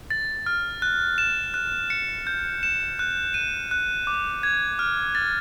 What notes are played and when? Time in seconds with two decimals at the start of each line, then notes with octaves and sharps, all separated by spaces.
0.10 A6
0.46 F6
0.82 F#6
1.18 E7
1.54 F#6
1.90 C#7
2.27 G6
2.63 E7
2.99 F#6
3.34 D#7
3.71 F#6
4.07 D6
4.43 G#6
4.79 F6
5.15 A6